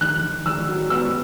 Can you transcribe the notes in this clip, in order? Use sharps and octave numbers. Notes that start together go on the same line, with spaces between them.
D#3 F#6
D#3
D#3 E6
F#3
B3 E6